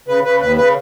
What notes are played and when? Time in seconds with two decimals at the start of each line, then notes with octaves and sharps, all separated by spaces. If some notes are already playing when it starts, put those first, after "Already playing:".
0.08 C#3 B4
0.25 C#3 B4
0.41 D#2 B4
0.57 C#3 B4